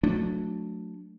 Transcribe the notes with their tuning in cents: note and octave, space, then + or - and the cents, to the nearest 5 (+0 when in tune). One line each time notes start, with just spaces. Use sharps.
F#3 -25 A3 +0 D4 +0